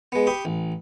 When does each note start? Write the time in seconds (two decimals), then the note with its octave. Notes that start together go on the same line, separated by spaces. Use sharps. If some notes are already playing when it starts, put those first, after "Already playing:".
0.12 G#3 B3
0.27 G4 B5 C#6 D#6
0.45 A1